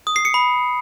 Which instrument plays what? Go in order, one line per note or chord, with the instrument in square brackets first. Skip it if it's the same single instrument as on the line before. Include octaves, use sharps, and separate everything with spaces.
[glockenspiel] D#6
C7
C#7
B5